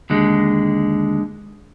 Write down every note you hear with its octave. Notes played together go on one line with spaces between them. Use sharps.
D#2 D3 G#3